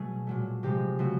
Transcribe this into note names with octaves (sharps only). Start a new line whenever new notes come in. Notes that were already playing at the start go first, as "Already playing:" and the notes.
Already playing: B2 F#3 A3 G#4
A#2 F#3 A3
C3 F3 G#3 G4
C#3 F3 A3 F#4